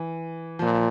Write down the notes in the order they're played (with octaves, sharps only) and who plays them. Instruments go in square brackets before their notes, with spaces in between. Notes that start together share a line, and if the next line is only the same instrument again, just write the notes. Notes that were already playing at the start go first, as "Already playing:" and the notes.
Already playing: [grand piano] E3
[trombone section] A#2 [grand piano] F3